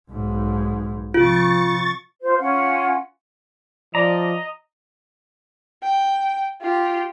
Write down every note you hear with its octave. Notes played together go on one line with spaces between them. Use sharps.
B1 G#2
C3 F3 F4 C#6 A6
F4 C5
C#4 F4 F#5
F3 D5 D#5 A#5
G5
F4 G4